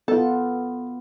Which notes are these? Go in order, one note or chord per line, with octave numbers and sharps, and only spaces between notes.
B3 F4 A4